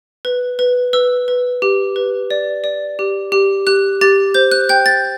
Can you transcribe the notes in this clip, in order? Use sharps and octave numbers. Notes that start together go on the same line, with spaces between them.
B4
B4
B4 E6
B4
G4
B4
D5
D5
G4
G4
G4 F#6
G4 A6
C5 G6
F#6
G5 G6
A6